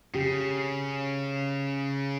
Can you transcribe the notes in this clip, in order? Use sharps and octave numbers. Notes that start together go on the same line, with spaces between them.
C#3 G4